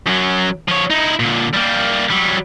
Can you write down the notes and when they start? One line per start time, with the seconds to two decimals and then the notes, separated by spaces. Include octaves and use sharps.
0.06 F#2 F#3
0.69 F3 C#5
0.90 D#4 E4
1.20 A#2 D3
1.54 G3 A#3
2.10 F#3 G3